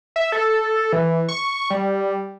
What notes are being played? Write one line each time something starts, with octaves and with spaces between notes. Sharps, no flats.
E5
A4
E3
C#6
G3